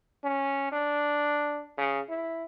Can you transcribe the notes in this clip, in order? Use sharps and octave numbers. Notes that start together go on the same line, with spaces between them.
C#4
D4
C#3
E4